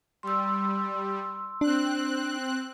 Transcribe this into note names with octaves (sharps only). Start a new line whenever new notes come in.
G3 C6 E6
C4 D4 F#6